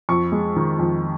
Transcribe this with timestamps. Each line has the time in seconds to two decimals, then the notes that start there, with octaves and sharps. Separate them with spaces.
0.09 F2 C#6
0.32 G#3
0.56 D#3
0.79 F2